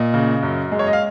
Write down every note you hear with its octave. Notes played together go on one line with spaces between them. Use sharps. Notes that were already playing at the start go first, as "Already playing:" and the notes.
Already playing: A#2 D#5
C#3
F#2
G#3
C#5
D#5
F5